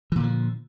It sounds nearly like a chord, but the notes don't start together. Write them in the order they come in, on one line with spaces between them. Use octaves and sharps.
E3 A#2 D3 F3